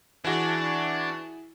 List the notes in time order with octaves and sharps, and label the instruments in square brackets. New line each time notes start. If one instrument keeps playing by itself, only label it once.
[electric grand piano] E3 F#4 [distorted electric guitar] D4 [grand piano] E4 G#4